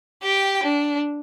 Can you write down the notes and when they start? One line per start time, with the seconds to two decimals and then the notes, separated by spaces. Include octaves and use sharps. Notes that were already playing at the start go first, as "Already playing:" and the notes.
0.23 G4 G5
0.63 D4